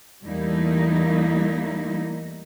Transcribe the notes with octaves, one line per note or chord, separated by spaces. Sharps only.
E2 G3 A3 A#3 D#4 E4